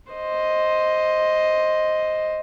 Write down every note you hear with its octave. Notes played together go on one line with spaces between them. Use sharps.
C5 D#5